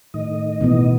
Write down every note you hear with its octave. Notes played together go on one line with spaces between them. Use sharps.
A2 D#3 D#5
B2 E3 B3